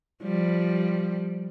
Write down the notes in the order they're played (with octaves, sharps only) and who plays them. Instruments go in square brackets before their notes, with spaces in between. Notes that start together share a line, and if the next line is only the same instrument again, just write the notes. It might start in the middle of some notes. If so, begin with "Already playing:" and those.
[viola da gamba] F3 G3